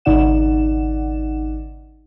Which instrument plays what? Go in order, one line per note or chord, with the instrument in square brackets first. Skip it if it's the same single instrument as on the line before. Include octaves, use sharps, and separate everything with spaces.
[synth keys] G#1 C#3 D#4 D5 F#5 E7